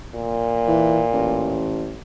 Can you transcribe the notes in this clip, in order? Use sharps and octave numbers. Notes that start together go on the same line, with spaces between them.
A#2
E3
A1